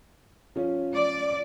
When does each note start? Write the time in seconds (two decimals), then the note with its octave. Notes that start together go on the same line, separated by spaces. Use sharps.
0.56 F3 C#4
0.94 D5